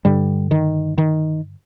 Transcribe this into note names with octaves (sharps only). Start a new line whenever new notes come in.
G2 D3 G3
D#3
D#3